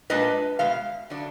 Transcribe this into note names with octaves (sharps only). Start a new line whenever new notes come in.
A#2 G#3 D4 B4 D#5
B2 G#3 F5
D3 F#3 D4